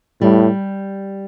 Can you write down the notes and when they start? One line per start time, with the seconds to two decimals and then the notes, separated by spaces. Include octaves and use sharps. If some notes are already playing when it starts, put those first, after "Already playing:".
0.21 A2 G3